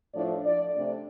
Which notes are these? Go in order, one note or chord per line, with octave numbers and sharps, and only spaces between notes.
A2 F3 D4 D5
D5
C3 A3 D4